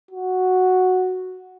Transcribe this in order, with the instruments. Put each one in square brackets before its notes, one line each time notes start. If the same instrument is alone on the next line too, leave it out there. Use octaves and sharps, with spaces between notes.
[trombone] F#4